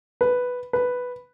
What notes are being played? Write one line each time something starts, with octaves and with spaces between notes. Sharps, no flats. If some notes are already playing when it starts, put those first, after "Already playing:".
B4
B4